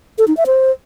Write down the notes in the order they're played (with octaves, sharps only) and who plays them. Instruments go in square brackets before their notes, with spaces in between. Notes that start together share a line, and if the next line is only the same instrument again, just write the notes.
[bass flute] A4
D#4
E5
C5